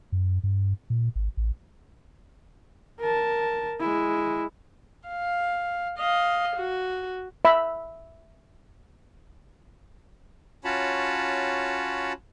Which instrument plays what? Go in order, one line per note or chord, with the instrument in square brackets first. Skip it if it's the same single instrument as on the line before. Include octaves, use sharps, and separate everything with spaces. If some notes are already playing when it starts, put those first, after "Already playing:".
[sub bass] F#2
G2
A#2
G#1
A1
[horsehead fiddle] A#4 A5
G#3 E4
[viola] F5
D#5 F5
F#4
[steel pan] E5 B5
[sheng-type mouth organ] C#4 F4 F#4 C#5 A5 B5